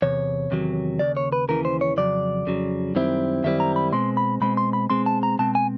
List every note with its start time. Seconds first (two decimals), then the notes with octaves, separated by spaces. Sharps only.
0.02 E2 C3 C#5
0.51 E2 C3 D#3 F#3
0.99 D#2 C#3 D5
1.17 C#5
1.32 B4
1.48 D#2 C#3 E3 A#4
1.65 C5
1.81 C#5
1.97 F2 C#3 F#3 D5
2.46 F2 C#3 F#3
2.95 F#2 D#3 G3 C4 E4
3.44 F#2 D#3 G3 C4 E4 E5
3.60 A#5
3.76 B5
3.92 B2 G#3 C4 C6
4.17 B5
4.41 B2 G#3 C4 B5
4.57 C6
4.73 B5
4.90 B2 G#3 C4 C6
5.06 A5
5.23 A#5
5.39 B2 G#3 C4 A5
5.55 G#5